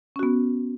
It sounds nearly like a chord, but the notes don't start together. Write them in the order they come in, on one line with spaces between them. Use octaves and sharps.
C#4 F#4 B3